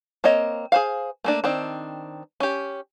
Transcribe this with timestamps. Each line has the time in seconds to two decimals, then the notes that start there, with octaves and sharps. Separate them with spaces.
0.24 A#3 C4 C#5 D#5
0.72 G#4 C5 F5
1.24 A3 A#3 D4
1.44 D#3 C4 D4
2.40 C#4 G4